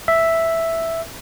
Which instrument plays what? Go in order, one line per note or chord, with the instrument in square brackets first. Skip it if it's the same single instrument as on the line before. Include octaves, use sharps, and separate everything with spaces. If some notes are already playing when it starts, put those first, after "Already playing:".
[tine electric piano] E5